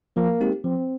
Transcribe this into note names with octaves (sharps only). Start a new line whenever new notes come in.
F3 A#3
G#3 C4 D#4 G4
F3 C4